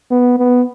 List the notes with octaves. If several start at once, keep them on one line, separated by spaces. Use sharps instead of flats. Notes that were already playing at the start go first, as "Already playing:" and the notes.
B3
B3